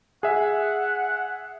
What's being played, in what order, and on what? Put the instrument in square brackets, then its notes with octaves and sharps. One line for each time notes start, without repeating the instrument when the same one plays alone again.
[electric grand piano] G#4 E5 [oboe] F#5